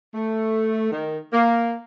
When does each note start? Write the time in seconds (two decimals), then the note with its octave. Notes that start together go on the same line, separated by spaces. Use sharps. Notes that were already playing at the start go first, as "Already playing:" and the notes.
0.14 A3
0.91 D#3
1.33 A#3